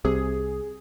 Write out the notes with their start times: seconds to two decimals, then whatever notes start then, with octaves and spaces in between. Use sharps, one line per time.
0.05 C2 C3 G#4